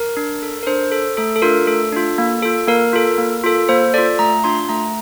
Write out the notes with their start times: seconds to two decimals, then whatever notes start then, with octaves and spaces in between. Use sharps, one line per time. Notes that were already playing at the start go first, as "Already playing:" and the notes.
Already playing: A#4
0.17 D4
0.42 A4
0.63 A#4
0.67 D4 C5
0.92 A4
1.17 A3 A4
1.36 A4
1.42 D4 F4 A#4
1.67 A3 A4
1.92 D4 F4
2.18 A#3
2.42 F4 A4
2.68 A#3 A#4
2.93 F4 A4
3.18 A#3
3.44 F4 A4
3.69 A#3 C5
3.94 F4 A4 D5
4.19 A3 A#5
4.44 D4 F4 C6
4.69 A3 A#5